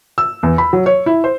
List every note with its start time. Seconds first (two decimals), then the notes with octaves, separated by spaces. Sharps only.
0.18 E6
0.43 E2
0.58 B5
0.73 F#3
0.86 C#5
1.06 E4
1.24 C5